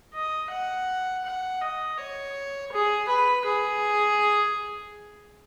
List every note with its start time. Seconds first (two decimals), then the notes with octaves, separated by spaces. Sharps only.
0.13 D#5
0.50 F#5
1.24 F#5
1.61 D#5
1.97 C#5
2.71 G#4
3.08 B4
3.45 G#4